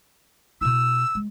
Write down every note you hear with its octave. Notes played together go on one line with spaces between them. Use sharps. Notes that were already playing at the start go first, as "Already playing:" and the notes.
B2 E4 E6
G#3